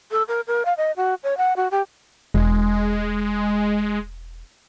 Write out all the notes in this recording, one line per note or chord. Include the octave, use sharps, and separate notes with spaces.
A4
A#4
A#4
F5
D#5
F#4
C#5
F#5
F#4
G4
E1 G#3